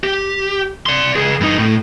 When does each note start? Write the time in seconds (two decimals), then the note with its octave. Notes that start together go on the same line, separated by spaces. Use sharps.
0.04 G4
0.86 D5 C6
1.16 C#2 G#4
1.40 G2 D#4
1.58 A2